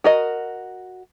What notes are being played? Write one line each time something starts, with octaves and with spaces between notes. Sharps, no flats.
F#4 A#4 D#5